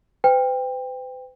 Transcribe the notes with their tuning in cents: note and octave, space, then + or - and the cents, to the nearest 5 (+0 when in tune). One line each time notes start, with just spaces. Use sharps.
B4 +45 G5 +20